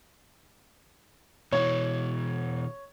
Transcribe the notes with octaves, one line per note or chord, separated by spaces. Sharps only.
B2 E3 C#5